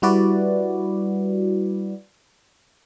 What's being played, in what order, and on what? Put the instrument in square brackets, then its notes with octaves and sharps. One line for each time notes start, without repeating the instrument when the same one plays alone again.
[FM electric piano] G3 E4 F#4 B4 D5